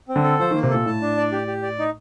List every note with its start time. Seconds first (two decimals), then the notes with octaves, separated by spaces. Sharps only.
0.09 C4
0.16 D3
0.24 A4
0.40 F3 C5
0.51 D#3
0.55 A#3
0.63 C3
0.70 A#2 A4
0.86 A2 A5
1.01 D4
1.17 D5
1.32 G4
1.47 G4
1.63 D5
1.79 D#4